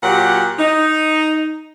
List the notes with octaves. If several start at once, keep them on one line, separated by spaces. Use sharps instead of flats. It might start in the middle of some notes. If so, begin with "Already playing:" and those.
A#2 F#3 G4 F#5
D#4